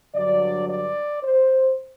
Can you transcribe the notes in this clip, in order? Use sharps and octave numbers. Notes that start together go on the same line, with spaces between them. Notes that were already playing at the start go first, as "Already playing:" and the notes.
G2 D3 F#3 D5
D5
C5